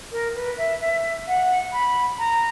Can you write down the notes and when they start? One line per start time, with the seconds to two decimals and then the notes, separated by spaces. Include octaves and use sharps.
0.12 A#4
0.35 B4
0.58 E5
0.81 E5
1.27 F#5
1.73 B5
2.19 A#5